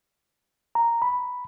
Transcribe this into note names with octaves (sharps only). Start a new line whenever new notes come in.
A#5
B5